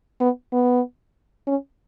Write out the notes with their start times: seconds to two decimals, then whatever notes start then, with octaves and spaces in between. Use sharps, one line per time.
0.20 B3
0.52 B3
1.47 C#4